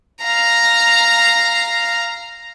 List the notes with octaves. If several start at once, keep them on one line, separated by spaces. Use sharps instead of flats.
F5 A#5